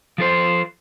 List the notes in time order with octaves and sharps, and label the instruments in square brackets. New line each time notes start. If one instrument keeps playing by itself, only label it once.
[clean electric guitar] F3 A4 C5